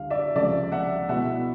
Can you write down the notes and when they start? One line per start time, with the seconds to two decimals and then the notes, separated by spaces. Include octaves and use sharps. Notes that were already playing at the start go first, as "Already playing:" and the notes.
Already playing: D2 D3 G3 F5
0.10 D5 E5
0.35 C#2 C3 F3 A3 D5 E5
0.72 E5 F#5
1.09 B2 G#3 B3 E4 E5 F#5